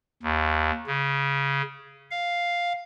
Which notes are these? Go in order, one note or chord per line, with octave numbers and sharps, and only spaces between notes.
D#2
C#3
F5